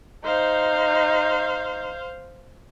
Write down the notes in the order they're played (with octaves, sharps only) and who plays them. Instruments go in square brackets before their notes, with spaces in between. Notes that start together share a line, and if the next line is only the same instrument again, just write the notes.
[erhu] D#4 [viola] C5 F5